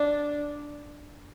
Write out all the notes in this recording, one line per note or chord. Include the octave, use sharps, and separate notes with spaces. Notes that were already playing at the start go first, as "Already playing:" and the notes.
Already playing: D4